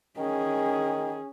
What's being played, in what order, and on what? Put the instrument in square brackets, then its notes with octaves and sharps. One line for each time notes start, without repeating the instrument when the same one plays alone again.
[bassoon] D#3 [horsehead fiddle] C#4 G#4